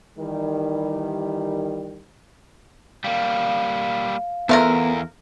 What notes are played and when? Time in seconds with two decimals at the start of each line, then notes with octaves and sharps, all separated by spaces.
0.19 D#3 E3 G3
3.04 G3 A#3 F5
4.49 E2 A3 B3 F4 A#4